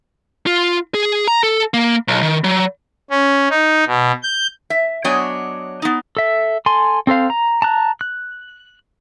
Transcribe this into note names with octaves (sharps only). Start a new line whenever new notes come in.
F4
G#4
A#5
A4
A#3
B1
D#3
F#3
C#4
D#4
B2
G6
E5
F#3 B3 D4 C#5 D#5 G#5
B3 D#4
A4 E5
A4 G#5 C6
C4 A4 C5 F5
A#5
A5 A#5 F#6
F#6